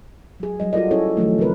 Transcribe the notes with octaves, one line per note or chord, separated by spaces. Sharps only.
F#3 G#4
F#3 G3 D#5
F4 F#4 A4 A#4 D5 D#5
C#4 E4 F4 G#4 A4 C#5
D#3 F3 F#3 A3
C#3 F#3 C4 A#4 B4